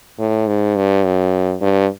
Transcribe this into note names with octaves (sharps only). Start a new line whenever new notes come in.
A2
G#2
G2
F#2
G2